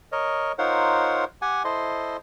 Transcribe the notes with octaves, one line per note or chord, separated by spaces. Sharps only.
A#4 C#5 D#5
D#4 F4 A#4 C5 C#5 F#5
G4 F#5 G#5
E4 A4 C5 D#5 C6